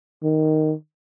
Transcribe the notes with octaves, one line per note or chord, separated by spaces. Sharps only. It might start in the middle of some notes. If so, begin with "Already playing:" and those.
D#3